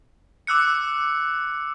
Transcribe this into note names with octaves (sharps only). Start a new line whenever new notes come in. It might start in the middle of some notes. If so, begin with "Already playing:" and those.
D6 E6 F#6 C#7